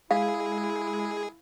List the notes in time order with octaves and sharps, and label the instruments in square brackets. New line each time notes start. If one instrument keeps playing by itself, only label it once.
[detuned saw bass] G#3 [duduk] E4 [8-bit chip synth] G#4 [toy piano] F5